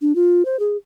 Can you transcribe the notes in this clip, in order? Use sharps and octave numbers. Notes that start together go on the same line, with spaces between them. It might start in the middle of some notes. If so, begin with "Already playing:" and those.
D4
F4
C5
G#4